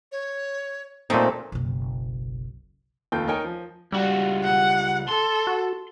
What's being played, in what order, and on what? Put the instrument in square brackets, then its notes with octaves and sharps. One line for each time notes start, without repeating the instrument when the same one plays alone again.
[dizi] C#5
[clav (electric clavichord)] A#2 A3 D#4 [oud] C4 [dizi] A4
[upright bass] F#1 B1
[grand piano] F1 D#2 F4 A4 G5 G6
D#4 A#4 C#5 G5 G#5
F3
[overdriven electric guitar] C#2 F#4 [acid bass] G3
[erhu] F#5
[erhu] A4 [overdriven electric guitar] C6
[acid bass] F#4